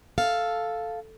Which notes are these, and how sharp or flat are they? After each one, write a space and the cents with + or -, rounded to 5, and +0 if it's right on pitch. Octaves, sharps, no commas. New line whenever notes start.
A4 +0 F5 +0